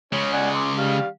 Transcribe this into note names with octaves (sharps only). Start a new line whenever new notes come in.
C#3 G#3 C#4
D5 F#5 G#5
C6 D6
G3 F5